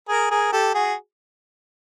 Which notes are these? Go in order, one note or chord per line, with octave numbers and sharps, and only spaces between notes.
G#4 A#4
G#4 A#4
G4 A4
F#4 G#4